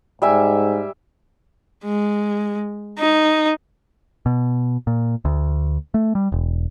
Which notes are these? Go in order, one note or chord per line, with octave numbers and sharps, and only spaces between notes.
G#2 G3 E5 G#5
G#3
D#4
B2
A#2
D2
A3
G3
E1